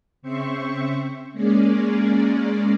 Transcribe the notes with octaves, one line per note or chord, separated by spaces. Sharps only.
C#3 C4 C5 E5 C#6
G#3 A#3 C#4 G#4 D5